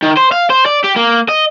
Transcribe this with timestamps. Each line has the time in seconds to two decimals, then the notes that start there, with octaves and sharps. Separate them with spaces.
0.03 D#3
0.17 C5
0.32 F5
0.50 C5
0.66 D5
0.84 G4
0.97 A#3
1.29 D#5